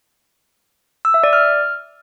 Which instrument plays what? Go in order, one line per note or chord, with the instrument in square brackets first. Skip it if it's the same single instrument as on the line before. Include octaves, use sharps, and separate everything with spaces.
[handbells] E6
E5
D5
F6